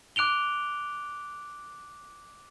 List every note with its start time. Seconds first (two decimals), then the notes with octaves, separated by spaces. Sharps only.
0.16 D6 F#6 D7 F7 G7